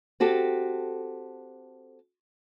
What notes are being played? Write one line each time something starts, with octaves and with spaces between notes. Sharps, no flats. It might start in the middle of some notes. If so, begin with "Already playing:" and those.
C4 F#4 G4 A4